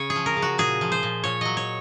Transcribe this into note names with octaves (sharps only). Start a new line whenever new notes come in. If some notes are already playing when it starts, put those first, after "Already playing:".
Already playing: C#3 C#5
G#4
F3
A#4
C#3
F#4
A#2 G#4
F3
C5
A#2
A#2 C#5
F#3 D#5
C#5